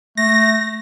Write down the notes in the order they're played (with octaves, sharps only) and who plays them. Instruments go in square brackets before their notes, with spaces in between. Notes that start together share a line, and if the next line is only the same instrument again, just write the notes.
[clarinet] A3 [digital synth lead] A#6